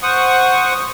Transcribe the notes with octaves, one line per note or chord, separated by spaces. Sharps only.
C5 F#5 C#6 D#6